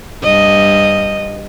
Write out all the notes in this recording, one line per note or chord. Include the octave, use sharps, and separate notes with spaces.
G2 D#5